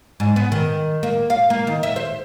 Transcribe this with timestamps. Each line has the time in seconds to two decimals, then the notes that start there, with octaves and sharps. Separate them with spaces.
0.20 G#2
0.36 B3
0.52 D#3
1.03 A#3
1.30 F5
1.50 A#3
1.67 D#3
1.83 E5
1.96 C5